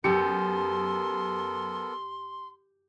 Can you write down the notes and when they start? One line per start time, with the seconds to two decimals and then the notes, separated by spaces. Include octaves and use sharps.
0.04 F#2 B3 G4 A4 A#4 C6 C#7